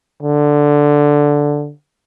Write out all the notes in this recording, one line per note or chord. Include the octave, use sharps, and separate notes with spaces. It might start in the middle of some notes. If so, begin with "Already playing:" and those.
D3